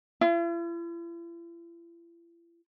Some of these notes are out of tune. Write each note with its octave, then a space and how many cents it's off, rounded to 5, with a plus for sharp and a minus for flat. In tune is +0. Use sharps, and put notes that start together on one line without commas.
E4 +45